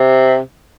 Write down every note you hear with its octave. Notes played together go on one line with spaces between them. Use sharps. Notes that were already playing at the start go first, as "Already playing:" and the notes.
Already playing: C3